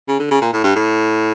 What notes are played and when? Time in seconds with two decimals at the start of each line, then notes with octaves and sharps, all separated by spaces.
0.08 C#3
0.19 D3
0.31 C#3
0.42 A#2
0.53 A2
0.64 G2
0.75 A2